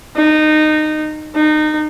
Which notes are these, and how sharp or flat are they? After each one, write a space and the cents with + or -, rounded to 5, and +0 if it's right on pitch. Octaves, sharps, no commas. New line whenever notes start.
D#4 -20
D#4 -25